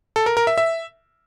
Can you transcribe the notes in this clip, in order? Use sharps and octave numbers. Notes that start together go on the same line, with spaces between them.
A4
A#4
A#4
E5
E5